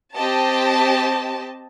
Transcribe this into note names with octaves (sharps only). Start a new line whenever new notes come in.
C4 G4 D#5 A5